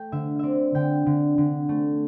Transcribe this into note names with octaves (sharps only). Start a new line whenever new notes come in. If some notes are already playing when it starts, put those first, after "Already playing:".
Already playing: A3 G5
D3 E5
C4 D5 E5
D3 G5
D3
D3
A3